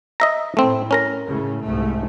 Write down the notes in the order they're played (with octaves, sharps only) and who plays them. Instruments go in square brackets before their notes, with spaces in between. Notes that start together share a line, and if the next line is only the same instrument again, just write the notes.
[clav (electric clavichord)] D#5 E5 A#5
[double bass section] A2 [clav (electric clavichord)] A3 C4
[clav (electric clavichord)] C#4 A#4 A#5
[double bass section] A2 C#3
C2 G#2 A3